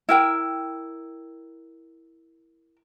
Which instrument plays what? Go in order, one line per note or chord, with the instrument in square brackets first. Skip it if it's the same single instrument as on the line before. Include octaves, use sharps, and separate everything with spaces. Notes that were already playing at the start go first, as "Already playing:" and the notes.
[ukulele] E4 A#4 G5